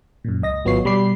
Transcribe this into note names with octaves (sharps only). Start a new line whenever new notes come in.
F#2 A#2
C#2 D#5 A#6
G#1 F#3 B3 F4 C#5 C7
B2 G3 B5 D6 C7